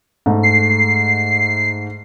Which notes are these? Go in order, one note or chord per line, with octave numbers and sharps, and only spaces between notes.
G#2 A3
C7